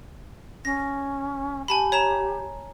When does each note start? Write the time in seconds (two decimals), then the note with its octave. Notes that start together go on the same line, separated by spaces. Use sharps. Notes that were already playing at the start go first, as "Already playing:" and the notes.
0.65 C#4 A#6
1.68 G4 G#5 A5 B5
1.92 C#5 A#5 E7